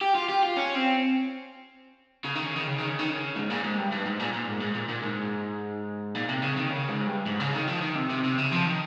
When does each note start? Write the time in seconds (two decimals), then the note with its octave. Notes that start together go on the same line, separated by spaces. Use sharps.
0.01 G4
0.15 F4
0.29 G4
0.43 F4
0.57 C#4
0.75 C4
2.24 C#3
2.35 D#3
2.46 C#3
2.56 D#3
2.67 C#3
2.78 D#3
2.88 C#3
2.99 D#3
3.10 C#3
3.36 G#2
3.50 A#2
3.63 G#2
3.78 G2
3.92 G2
4.05 G#2
4.19 A#2
4.33 A#2
4.48 G#2
4.61 G#2
4.75 A#2
4.89 A#2
5.03 G#2
6.15 A#2
6.29 C3
6.43 C#3
6.57 D#3
6.70 C#3
6.89 G#2
7.07 G2
7.26 G#2
7.40 C#3
7.54 D#3
7.68 F3
7.82 D#3
7.96 C3
8.10 C3
8.24 C3
8.38 C#3
8.52 F3
8.65 D#3